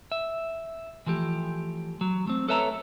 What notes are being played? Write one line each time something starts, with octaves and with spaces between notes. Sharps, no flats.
E5
E3 F3 A3 G4
F#3
A3 C4
A4 B4 C#5 E5 A5 A#5